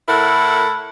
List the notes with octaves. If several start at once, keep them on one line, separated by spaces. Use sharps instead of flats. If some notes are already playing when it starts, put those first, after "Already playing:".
A2 E4 A4 A#4 F#5